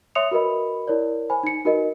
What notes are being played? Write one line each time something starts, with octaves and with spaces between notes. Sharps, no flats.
C#5 E5 C6 D#6 C#7 F7
F#4 A#4 B4 D#5 B5
E4 A#4 C#5 D5
C5 G#5 B5
D#4 C#7
D#4 F#4 A#4 B4 D#5